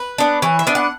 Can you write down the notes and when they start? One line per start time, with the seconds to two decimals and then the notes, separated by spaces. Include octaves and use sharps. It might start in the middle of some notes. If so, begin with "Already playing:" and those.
Already playing: B4
0.18 B3 D4
0.42 E3 C#5
0.59 E5
0.67 B3 D4
0.75 F#5